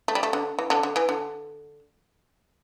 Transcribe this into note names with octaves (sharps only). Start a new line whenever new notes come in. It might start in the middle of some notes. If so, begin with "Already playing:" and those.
A3
G3
A3
D3
E3
D3
D3
E3
D3